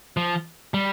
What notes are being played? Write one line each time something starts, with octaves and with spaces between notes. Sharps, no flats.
F3
G3